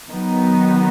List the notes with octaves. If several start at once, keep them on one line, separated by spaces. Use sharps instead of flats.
D#3 F#3 B3 D#4